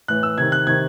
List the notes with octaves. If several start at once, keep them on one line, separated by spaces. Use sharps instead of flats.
A2 E3 F#6
E6
C3 D#3 G#6
F#6
C3 D#3 G#6